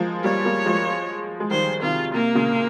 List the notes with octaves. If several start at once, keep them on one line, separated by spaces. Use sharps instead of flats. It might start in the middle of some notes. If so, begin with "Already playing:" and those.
Already playing: F3 G#3 A#3
G3 A#3 C#5
G3 A#3
F3 G#3
G#3
D#3 G3 C5
C3 D#3 F4
C3 A#3
A#2 C#3